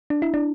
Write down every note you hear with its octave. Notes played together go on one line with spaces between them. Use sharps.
D4
E4
D4